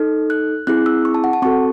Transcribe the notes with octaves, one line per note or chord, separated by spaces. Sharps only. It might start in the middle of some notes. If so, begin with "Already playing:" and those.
Already playing: D#4 A4
F#6
C4 E4 G#4 F#6
E6
C#6
A5
F#5
A5
C4 F#4 A4 C#6